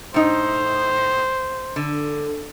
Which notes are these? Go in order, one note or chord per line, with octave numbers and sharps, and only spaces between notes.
A2 D#4 C5
D3